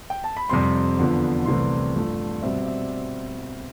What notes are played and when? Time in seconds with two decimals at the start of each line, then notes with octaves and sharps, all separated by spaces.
0.10 G5
0.24 A5
0.37 B5
0.50 F2 C3 G3 C4 C6
0.98 E2 D3 F3 B3
1.46 C2 C3 E3 A3 C4 C6
1.94 G2 F3 A3
2.42 B2 G3 C4 E5
2.59 D5
2.66 E5